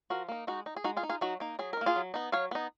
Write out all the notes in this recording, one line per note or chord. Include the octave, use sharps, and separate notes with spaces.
F3 F#4 A#4
A#3 D#4
G#3 D#4 F#4
D#4
G#4
G#3 D#4 F#4
F4 G#4
D#4
F4 G#4
F#3 D#4 F#4
A#3 D#4
F#3 G#4
D#4 A#4
A#3
F4 G#4
F#3
B3 D#4
F#3 C#5 F5
B3 D#4